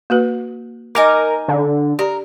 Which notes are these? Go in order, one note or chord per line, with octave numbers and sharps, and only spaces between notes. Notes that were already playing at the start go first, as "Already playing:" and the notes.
A#3 F#4 B4
D#4 A#4 G#5 D6
D3
G4 A#4 D5